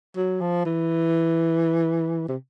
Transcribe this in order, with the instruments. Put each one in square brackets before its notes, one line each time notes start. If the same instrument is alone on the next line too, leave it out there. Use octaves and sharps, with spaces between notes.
[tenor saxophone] F#3
F3
E3
C3